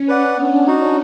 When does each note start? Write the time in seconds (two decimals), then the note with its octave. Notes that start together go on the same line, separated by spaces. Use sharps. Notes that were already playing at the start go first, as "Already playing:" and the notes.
Already playing: C#4
0.08 B4 D5 F#5
0.38 B3 D4
0.67 D#4 F#4